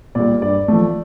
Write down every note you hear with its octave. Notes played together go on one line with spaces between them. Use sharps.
A#2 G3 D5
G2 D5
F3 A3